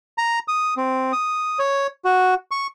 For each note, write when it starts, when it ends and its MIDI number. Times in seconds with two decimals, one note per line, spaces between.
0.18 0.39 82
0.48 0.74 87
0.77 1.12 60
1.12 1.59 87
1.59 1.87 73
2.05 2.34 66
2.51 2.67 85